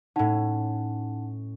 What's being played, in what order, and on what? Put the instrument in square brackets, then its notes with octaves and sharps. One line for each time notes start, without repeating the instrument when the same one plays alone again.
[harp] A2 C#4 [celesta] D#4 F#5 A5